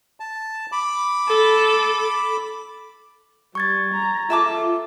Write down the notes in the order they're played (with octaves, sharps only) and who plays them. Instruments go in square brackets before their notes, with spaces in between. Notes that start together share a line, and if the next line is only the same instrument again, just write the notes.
[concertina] A5
B5 D6
[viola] A4
[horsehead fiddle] G3 [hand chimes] C#6 G#6 A6
[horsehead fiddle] A#5
[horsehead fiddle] F4 A4 [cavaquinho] E5 A5 D6